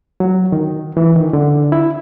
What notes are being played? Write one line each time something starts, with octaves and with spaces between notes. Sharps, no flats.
F#3
D#3
E3
D#3
D3
E4